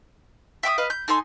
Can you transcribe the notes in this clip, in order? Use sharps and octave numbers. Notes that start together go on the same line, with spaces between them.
E5 G5 D6 D#6
B4 D#5 F5
G6
D#4 A4 G#5 C6